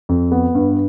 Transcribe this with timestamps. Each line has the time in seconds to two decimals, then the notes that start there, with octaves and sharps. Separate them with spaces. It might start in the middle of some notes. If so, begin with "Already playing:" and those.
0.09 F2
0.32 B3
0.55 G2